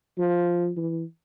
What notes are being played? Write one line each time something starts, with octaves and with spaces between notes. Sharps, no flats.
F3
E3